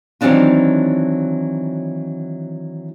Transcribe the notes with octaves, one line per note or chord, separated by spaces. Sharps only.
D#3 E3 F#3 C4 D4 F4